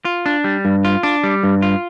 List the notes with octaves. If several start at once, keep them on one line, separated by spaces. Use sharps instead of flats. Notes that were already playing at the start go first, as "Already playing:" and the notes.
F4
D4
G3
G2
F4
D4
G3
G2
F4